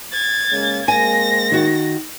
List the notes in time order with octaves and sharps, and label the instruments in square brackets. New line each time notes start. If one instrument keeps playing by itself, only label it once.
[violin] G#6 A6
[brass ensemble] C#3 G#3 A#3
[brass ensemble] G#3 A#3 C4 [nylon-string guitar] G#5 [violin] A#6
[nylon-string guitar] D#3 F#4